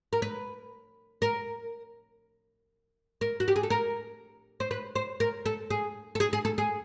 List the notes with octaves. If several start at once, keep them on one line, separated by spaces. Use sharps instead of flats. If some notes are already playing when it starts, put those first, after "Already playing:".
A#4
B4
A#4
A#4
F#4
G4
G#4
A4
A#4
C5
B4
C5
A#4
A4
G#4
A4
G#4
G#4
A4
G#4